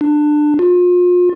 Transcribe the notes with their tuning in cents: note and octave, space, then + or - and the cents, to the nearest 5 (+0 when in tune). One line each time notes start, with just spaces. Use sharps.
D4 +20
F4 +35